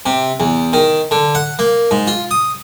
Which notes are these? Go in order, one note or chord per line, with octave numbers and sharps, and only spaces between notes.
C3
E2
D#3
D3
F#5
A#3
G#2
F4
D#6